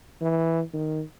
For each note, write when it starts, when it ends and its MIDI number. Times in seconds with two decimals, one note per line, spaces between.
0.21 0.61 52
0.73 1.02 51